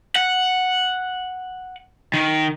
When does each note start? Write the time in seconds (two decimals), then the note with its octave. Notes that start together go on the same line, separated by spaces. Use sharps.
0.16 F#5
2.14 D#3